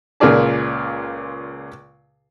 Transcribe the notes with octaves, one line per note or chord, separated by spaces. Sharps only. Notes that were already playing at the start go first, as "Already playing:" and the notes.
C#2 A#2 F4 G#4 D5 A5